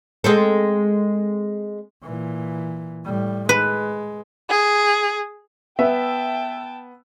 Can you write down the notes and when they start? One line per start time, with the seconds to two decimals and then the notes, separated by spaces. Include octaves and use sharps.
0.24 G#3 C4 A4
2.03 A#2 E3
3.05 A2 G3
3.49 G#3 B4
4.49 G#4
5.79 B3 E5 G5 A5